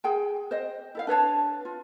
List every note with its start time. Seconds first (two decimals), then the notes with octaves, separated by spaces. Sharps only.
0.04 G#4 G5 G#5
0.51 C5 D#5
0.95 E4 A4 F5
1.07 D4 B4 C#5 A5
1.65 F4